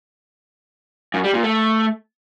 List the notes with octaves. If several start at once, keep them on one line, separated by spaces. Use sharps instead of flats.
F#2
G3
A#2
A3